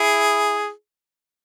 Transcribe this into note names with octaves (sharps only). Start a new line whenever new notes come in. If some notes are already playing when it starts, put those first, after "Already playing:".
Already playing: E4 G#4